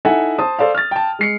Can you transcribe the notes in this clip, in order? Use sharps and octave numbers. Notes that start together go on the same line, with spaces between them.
D#4 E4 A4 E5 F#5 G#5
C5 A5 D#6
A4 C5 D5 F5
F6 A6
G5 A5
G#3 C7 C#7